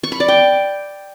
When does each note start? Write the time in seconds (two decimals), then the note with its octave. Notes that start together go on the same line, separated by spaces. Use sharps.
0.03 C#6
0.12 B5
0.20 D5
0.28 G5